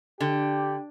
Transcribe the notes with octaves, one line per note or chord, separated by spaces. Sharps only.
D3 G4